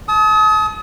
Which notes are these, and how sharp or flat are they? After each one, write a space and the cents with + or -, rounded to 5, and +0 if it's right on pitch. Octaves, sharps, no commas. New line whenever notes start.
A5 -35 D#6 +30